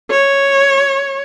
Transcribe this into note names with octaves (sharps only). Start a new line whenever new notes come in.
C#5